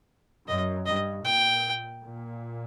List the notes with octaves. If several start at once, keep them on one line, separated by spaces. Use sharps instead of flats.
F#2 D#5
G2 D#5
A#2 G5
A#2